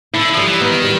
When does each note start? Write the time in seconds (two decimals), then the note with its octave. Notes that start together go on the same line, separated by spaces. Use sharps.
0.13 D3 E4
0.34 F3 G3
0.47 E3
0.61 D#3 B3
0.84 G3